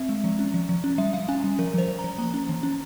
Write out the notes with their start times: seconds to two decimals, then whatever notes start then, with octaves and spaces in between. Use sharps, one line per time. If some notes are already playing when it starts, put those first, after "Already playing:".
Already playing: C4 E5
0.09 G#3
0.24 F3
0.39 C#4
0.54 F3
0.69 F3
0.84 C#4
0.98 G3 E5
1.13 G3 F5
1.29 C#4 G#5
1.44 G3
1.59 F3 A#4
1.74 F3 C5
1.88 F3
1.99 A#5
2.04 F3
2.18 A#3 A#5
2.34 C#4
2.49 E3
2.63 C#4